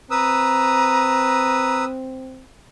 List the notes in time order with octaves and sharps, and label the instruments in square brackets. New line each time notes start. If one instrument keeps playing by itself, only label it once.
[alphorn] C4 [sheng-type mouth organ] B4 D#6 E6 [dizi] A#5